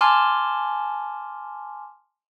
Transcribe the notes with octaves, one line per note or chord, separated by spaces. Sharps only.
G#5 A5 C6 D6 F6